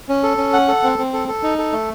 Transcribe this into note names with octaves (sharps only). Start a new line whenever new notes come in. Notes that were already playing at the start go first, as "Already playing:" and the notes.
C#4
A4
C#4
F#5
A4
C4
C4
A4
A4
D#4
A4
A3